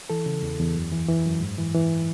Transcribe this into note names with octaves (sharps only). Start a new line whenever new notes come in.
E3 A4
C#3
E2
E2
F#2
E3
E3
F#2
G#2
E3
E3